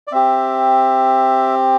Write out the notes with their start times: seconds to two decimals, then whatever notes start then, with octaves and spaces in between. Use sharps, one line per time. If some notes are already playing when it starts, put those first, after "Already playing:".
0.07 D5
0.12 C4 G4 E5